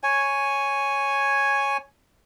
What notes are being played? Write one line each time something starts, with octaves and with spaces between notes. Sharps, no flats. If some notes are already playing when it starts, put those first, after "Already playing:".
C#5 G#5